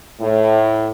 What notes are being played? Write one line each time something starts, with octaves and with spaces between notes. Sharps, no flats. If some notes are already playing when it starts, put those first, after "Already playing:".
A2